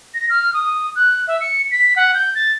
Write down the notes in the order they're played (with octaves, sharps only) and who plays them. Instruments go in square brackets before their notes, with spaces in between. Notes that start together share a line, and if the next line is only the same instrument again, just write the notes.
[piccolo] A#6
F6
D#6
F#6
E5
C#7
B6
F#5
G6
A6